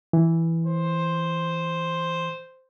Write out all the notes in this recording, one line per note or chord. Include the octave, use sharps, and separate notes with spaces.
E3
C5